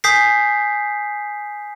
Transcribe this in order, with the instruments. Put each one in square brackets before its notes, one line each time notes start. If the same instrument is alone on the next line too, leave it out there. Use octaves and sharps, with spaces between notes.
[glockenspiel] G#5 D#6 G6 B6 C7